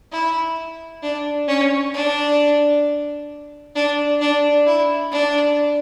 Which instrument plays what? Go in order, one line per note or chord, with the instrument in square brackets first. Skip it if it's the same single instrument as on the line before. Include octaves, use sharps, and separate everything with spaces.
[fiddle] E4
D4
C#4
D4
D4
D4
E4
D4